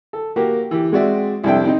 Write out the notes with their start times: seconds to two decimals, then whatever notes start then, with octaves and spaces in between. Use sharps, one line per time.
0.13 A4
0.36 A#3 F#4 G4 A#4
0.71 E3 G4
0.92 G#3 C4 F#4 D5 E5
1.44 C2 F2 G3 D4 E5 G5
1.65 C4 D#4 D#5